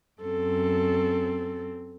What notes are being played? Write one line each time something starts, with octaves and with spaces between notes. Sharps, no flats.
F#2 C4 A4